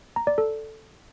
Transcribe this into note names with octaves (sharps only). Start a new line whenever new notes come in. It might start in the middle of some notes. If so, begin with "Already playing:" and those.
A#5
D5
A4